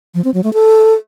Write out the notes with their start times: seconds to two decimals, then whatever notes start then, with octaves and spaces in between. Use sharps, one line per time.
0.15 F3
0.24 C4
0.34 F#3
0.44 A3
0.53 A4